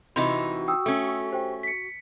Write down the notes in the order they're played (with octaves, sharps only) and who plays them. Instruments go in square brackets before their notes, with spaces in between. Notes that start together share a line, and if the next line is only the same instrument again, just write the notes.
[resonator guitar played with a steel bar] C3 E3 D#4 [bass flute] F#4 [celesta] B5 C6 F7
[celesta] G5 D#6 E6
[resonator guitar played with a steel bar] A3 C#4
[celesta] G4 C5 G5
B6 C#7